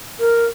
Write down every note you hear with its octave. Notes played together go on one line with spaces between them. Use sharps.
A#4